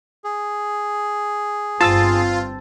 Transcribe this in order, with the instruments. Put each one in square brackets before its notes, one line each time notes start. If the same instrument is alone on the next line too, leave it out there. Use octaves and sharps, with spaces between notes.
[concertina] G#4
[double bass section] G1 G2 C4 [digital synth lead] F4 [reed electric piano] A5 E6 A6